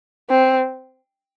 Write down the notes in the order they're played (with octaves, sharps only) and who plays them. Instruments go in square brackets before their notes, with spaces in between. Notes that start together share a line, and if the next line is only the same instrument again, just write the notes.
[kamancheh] C4